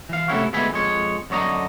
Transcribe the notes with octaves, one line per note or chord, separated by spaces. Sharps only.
E3 F5
C3 A3 C#4 E4 F#4
D2 G#3 B3 E5 G#5 B5
F2 G#3 C#5
F#2 D3 C#5 D#5 A#5